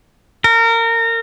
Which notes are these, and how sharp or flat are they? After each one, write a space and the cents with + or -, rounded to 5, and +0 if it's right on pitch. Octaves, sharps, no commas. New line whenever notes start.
A#4 -25